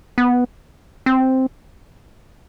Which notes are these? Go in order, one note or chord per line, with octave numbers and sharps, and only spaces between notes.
B3
C4